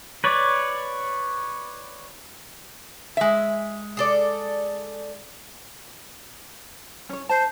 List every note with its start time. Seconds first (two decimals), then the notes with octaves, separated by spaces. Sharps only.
0.24 B4 C#5 D5
3.17 G#3 E5
3.97 G#4 A4 D5
7.09 C#4 C#5
7.29 C5 A5